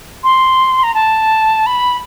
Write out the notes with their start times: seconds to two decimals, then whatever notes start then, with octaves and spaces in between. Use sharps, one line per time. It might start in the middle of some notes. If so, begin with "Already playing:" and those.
0.24 C6
0.83 A#5
0.94 A5
1.66 B5